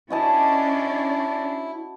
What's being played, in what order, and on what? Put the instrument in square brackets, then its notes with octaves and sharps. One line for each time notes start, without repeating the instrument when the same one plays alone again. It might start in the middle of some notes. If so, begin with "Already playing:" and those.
[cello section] C#4 D4 D5 [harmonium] E4 [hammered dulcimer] F#4 D#5 A5